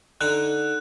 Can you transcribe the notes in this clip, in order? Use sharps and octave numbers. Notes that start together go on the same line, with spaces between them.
D3 D4 D#4 F#6